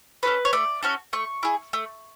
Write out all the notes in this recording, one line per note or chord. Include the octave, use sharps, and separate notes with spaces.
C#4 F#4 A4 B4
C#5
A3 D5
C#4 F#4 A4
A3 C#6
E4 G#4
A3